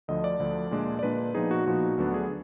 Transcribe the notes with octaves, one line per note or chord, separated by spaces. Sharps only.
D2 D3 F3 D#5
D5
D2 D3 F3
A#2 G#3 D4
D5
A#2 G#3 D4 B4
A#2 F3 B3 D#4 G#4
F#4
A#2 F3 B3 D#4 F#4
D2 D3 F#3 B3 D4 F#4
G#4